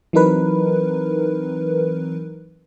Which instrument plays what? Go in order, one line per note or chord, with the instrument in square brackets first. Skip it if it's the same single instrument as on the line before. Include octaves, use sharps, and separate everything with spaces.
[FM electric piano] E3 F#3 C4 D#4 A#4 B4